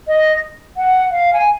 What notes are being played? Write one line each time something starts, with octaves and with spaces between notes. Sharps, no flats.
D#5
F#5
F5
G#5